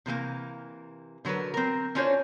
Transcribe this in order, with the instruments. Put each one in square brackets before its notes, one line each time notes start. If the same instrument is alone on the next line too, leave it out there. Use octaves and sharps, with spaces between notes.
[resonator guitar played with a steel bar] C3 E3 A3 A#3
D3 F#3 F#4 A#4 B4
C4 A#4
C#4 D4 F4 F#4 C5 C#5